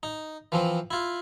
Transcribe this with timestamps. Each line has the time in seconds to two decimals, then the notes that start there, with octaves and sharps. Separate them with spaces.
0.03 D#4
0.52 E3 F3 C4
0.91 E4 F4